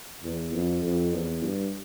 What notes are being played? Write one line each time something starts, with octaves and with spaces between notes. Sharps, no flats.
E2
F2
F2
E2
G2